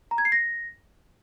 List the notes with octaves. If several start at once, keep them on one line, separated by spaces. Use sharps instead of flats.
A#5
G#6
C7
A#6